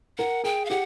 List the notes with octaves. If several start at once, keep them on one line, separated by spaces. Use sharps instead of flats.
A#4 F#5
G#4 G5
F5
G4 F#5